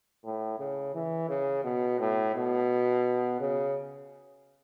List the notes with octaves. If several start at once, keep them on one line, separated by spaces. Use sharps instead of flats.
A2
C#3
E3
C#3
B2
A2
B2
C#3